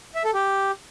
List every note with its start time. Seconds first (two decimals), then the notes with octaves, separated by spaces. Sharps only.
0.15 E5
0.25 A4
0.34 G4